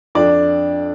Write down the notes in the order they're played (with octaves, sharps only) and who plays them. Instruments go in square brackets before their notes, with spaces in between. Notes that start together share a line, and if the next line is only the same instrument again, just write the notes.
[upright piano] F2 D4 D5